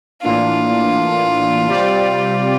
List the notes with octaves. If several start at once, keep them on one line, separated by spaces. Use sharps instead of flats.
A2 E3 A#3 D4 F4
C3 G3 C4 G4 D5